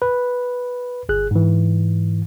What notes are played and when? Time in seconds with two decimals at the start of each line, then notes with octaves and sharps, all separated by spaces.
0.02 B4
1.09 G1 G#4 F#6
1.31 G#2 E3